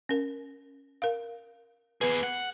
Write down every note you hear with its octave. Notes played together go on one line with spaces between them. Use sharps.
C#4 A#4
A#4 F5
B3 G#4 B4
F#5